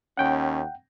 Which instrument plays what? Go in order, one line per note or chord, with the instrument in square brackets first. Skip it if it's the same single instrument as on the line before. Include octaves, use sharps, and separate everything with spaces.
[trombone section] D#2 C#4 [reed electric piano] F#5 G5